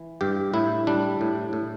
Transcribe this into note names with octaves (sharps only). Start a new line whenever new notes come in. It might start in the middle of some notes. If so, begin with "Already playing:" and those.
Already playing: E3
G2 G4
A2 E4
G3 D4
A2
A2